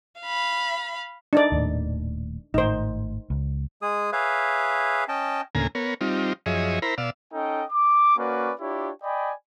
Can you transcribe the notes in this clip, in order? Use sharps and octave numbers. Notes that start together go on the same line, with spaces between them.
F5 B5
D4 D#4 D5
D#1 D#2 A2
G#1 A2 D#4 C5
C#2
G#3 G#4 D#6
G#4 B4 C#5 E5 F5
C#4 D#5 G5 A5
D2 A2 C#3 A#3 G#5 A#5
B3 A#4 C#5
G3 C4 D#4 F4
F#2 F3 G#4 C#5 D#5 E5
E4 A#4 C5 A#5 B5
B2 D5 F5 E6
C#4 D#4 A4 D#5 G5
D6
A#3 C#4 F#4 B4 D5
D4 E4 F4 G4 C#5
D5 D#5 G5 G#5 B5